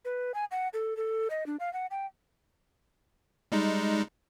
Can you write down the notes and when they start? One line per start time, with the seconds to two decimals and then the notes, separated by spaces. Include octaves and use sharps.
0.05 B4
0.34 G#5
0.51 F#5
0.74 A4
0.97 A4
1.30 D#5
1.46 D4
1.60 F5
1.73 F#5
1.91 G5
3.52 G3 G#3 D#4